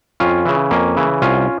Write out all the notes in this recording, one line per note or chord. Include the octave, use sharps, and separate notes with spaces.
F2 C#4 F4
C#3 E3
F2 A#3 C#4
C#3 E3
C2 C#4 F4